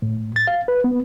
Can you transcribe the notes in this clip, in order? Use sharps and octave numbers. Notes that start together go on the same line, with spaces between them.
A2
A6
F5
B4
B3